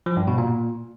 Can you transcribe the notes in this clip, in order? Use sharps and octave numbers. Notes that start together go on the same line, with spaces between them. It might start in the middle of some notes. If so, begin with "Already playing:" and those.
F3
G2
B2
A#2